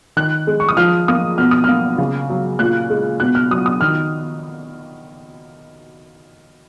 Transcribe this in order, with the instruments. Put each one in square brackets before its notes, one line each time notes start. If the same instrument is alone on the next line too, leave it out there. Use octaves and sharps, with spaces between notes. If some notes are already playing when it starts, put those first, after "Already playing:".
[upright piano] D#3 F#6
G#3
C#6
D#6
F3 F6
A#3 D#6
B2 F6
D#6
A#3 F6
C#3
F#3
A#2 F#6
G#3
B2 F#6
F6
F#3 D#6
D#6
D#3 F6